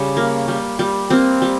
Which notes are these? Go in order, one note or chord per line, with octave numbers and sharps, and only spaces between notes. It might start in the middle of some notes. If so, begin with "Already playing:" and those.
Already playing: C#3 G3
A#3
G3
G3
A#3 C4
G3